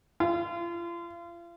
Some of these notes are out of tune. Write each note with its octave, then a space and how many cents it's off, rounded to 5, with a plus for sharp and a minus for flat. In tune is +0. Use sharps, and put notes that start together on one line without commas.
F4 -35